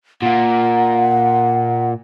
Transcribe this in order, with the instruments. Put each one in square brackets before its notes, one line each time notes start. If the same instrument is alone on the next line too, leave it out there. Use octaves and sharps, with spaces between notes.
[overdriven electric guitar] A#2 A#3 [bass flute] F#5